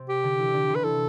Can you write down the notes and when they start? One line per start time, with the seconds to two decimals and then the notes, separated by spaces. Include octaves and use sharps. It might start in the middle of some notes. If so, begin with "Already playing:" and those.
Already playing: C3 C4
0.09 G4
0.23 D3 D4
0.38 E3 E4
0.54 D3 D4
0.69 C3 C4
0.75 B4
0.84 E3 E4 A4